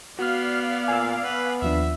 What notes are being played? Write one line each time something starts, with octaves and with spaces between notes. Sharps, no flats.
B3 F#4 D5 F5 F6
A#2 G#5 E6
B3 B4
D#2 F3 D4 E5